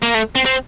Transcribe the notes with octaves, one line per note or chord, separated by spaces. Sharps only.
A#3
A3
C4
C4